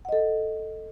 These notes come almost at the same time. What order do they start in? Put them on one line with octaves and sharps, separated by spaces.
F#5 D#5 A4